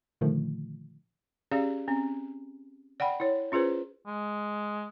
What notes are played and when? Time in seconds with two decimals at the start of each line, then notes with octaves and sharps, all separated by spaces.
0.21 A#2 D3 D#3 F3 A3
1.51 C#4 G4 G#4 D5 F5
1.88 C4 C#4
3.00 D5 F#5 G5 B5
3.20 E4 C#5
3.52 C#4 F4 G#4 B4 C5
4.07 G#3